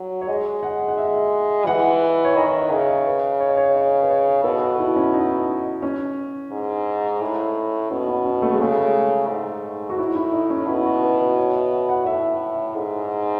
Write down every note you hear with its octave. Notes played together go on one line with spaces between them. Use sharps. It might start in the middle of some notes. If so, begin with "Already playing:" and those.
Already playing: F#3
C#5
G#3 D#5
F#5
F#5
E5
E3 F#5
C#5
D#3 D#5
D#5
E5
C#3 D#5
D#5
B4
C#5
D#5
C#5
C#5
D#5
B4
C#5
B2 A4
F#4
E4
C#4
D#4
C#4
G#2
A2
B2 C#4
C#4
C#4
A3
G#3
C#3 A3
G#2
F#4
A2 E4
E4
D#4
C#4
B2 E4
F#4
B4
B4
C#5
E5
F#5
F#5
A2 E5
G#2